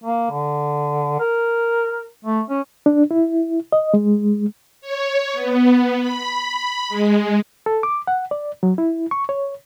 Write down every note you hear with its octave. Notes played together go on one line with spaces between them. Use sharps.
A#3
D3
A#4
A3
C#4
D4
E4
D#5
G#3
C#5
B3
B5
G#3
A4
D6
F#5
D5
F#3
E4
C#6
C#5